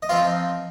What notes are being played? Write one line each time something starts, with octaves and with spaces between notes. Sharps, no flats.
D#5
F3 C4 D#4 F4 F5